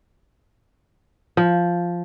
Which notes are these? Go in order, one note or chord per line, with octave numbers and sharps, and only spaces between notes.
F3